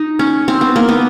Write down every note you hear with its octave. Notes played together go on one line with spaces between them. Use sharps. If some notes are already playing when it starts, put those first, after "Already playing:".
Already playing: D#4
C#4
C4
B3
A#3
B3